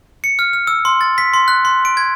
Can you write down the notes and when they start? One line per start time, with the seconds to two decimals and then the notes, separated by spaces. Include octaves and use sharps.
0.24 C#7
0.39 F6
0.53 F6
0.67 E6
0.85 C6
1.01 A6
1.18 B6
1.33 C6
1.48 F#6
1.65 C6
1.85 D7
1.97 G#6